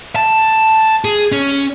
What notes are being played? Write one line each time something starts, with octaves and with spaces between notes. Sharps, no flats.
A5
G#4
C#4